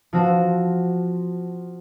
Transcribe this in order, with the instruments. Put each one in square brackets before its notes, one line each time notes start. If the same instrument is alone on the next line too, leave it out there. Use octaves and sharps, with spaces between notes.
[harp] F3 C4 F#4